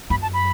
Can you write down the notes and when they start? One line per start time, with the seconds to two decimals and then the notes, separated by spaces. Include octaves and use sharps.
0.10 F#2 B5
0.22 A5
0.34 B5